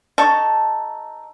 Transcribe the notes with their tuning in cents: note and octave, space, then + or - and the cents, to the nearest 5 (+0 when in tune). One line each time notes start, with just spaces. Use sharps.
D#4 +0 A4 +0 C#6 +0